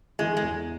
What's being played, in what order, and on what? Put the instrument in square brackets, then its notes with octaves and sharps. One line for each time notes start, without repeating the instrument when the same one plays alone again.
[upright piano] E3 [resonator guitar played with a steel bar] G#3
[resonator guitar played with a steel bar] G#3
[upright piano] E2